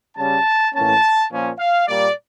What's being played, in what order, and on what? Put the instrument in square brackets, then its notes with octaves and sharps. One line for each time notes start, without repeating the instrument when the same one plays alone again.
[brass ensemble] C#3 G3 C#4 A5
A2 E3 A#3 C#4 A5
A#2 F3 A#3 C#4
F5
A#2 G3 A#3 D5